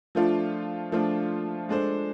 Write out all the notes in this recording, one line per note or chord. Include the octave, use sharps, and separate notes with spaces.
F3 A3 D4 F4
F3 A3 D4 F4
G#3 D4 A4 C5